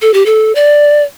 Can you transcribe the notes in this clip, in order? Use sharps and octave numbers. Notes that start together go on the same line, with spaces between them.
A4
G4
A4
D5